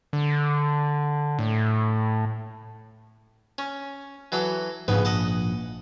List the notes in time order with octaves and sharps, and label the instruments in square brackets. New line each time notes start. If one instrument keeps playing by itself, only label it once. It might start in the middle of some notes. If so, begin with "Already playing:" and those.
[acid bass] D3
A2
[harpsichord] C#4
E3 F#3 A4
[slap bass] A#1 [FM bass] G#2 [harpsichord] C#3 B3
[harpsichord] D#5 F#5 A5